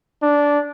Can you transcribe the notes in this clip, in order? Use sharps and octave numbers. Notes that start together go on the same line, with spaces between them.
D4